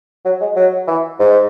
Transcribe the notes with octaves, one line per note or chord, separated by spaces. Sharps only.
F#3
G#3
F#3
E3
G#2